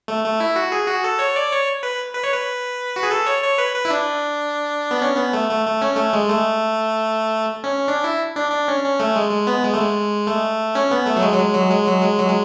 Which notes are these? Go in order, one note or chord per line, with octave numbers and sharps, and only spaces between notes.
A3
A3
E4
F#4
G#4
F#4
A4
C#5
D5
C#5
B4
B4
C#5
B4
F#4
G#4
A4
C#5
C#5
B4
B4
E4
D4
B3
C#4
B3
A3
A3
A3
C#4
A3
G#3
A3
C#4
D4
E4
D4
D4
C#4
C#4
A3
G#3
G#3
B3
G#3
A3
G#3
A3
C#4
B3
A3
F#3
G#3
F#3
G#3
F#3
G#3
F#3
G#3
F#3
G#3